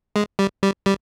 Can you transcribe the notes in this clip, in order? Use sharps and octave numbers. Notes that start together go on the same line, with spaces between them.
G#3
G3
G3
G3